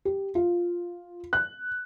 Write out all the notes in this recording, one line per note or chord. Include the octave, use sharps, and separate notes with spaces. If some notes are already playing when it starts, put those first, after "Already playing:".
G4
F4
F#6